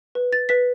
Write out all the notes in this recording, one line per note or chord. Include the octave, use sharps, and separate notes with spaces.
B4
A6
B4 B6